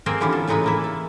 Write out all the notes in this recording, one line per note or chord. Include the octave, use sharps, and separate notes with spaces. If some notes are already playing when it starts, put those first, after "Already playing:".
A#3 C4 G#4 A#4 C5 G5
D3 E3 F3 G3 B3 C#4
A4
A2 C#3 G#3 D#4 B4 G#5
E3 A#3 E4
A4